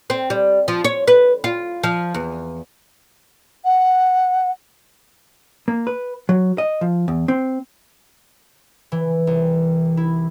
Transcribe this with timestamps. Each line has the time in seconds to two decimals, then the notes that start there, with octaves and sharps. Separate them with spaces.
0.10 C4
0.30 G3
0.68 F3
0.84 C#5
1.08 B4
1.44 F4
1.83 F3
2.14 E2
3.64 F#5
5.68 A#3
5.87 B4
6.29 F#3
6.58 D#5
6.81 F3
7.08 E2
7.28 C4
8.92 E3
9.27 C2
9.97 E4